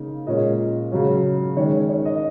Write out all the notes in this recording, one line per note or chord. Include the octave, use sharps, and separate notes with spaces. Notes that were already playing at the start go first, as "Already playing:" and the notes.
Already playing: C#3 A#3 D#4
A#2 G#3 C#4 D#5
C#3 F#3 C#4
D#3 G#3 C#4 C#5
C#5
D#5